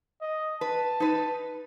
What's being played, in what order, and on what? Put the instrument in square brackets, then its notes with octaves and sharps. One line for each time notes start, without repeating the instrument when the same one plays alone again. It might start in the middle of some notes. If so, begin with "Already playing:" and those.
[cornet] D#5
[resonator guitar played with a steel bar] B4 [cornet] A5
[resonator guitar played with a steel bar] D#4 B4